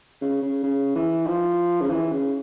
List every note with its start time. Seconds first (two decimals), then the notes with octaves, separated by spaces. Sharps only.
0.21 C#3
0.42 C#3
0.63 C#3
0.95 E3
1.27 F3
1.81 C#3
1.90 E3
2.12 C#3